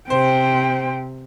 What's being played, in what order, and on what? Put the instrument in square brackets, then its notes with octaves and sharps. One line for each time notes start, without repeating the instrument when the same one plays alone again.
[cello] C3 [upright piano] C5 [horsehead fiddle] G5